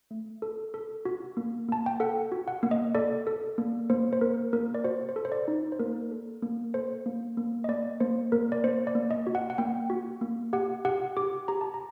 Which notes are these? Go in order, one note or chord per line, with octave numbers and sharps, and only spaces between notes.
A3
A4
A4
F#4
A#3
A#3 A5
G5
A4 F#5
F#4
F#5
A#3
D#5
A4 D5
A4
A#3
A#3 C5
C5
A#3 A#4
A#3 A#4
D5
F#4 C5
C5
A4
C5
D5
D#4
C5
A#3 A#4
A4
A#3
A4 C5
A#3
A#3
D#5
A#3 D5
A#3 C5
A#3 A#4
D5
A#3 C5
D5
A#3
D#5
F#4
F#5
F#5
A#3 G5
F#4
A#3
G4 F#5
G4 F#5
G4 D6
G4 A#5
A5
A#5